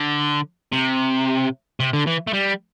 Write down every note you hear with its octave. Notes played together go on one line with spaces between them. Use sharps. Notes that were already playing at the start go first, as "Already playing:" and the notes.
Already playing: D3
C3
C3
D3
E3
A3
G3